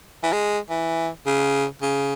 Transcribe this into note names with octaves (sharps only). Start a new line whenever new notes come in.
E3
G#3
E3
C#3
C#3